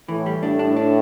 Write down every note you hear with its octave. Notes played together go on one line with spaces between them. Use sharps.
A2 E3
G3
A2 D4
D4
D4